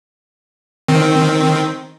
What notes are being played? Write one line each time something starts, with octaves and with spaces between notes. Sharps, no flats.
D#3 C4